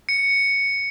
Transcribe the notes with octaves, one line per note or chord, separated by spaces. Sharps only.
C#7